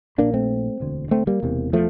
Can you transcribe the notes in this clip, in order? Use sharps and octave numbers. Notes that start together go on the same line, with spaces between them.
A#1 A#2 A#3 D4
A3 C4
E1 D2 D3
A3 C4
G3 A#3
E1 E2 C3
F3 A3